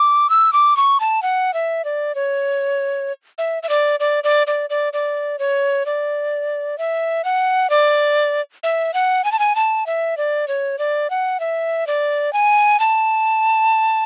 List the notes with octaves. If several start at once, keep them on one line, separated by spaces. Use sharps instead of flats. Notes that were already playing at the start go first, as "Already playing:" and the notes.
Already playing: D6
E6
D6
C#6
A5
F#5
E5
D5
C#5
E5
E5
D5
D5
D5
D5
D5
D5
C#5
D5
E5
F#5
D5
E5
F#5
G#5
A5
G#5
A5
E5
D5
C#5
D5
F#5
E5
D5
G#5
A5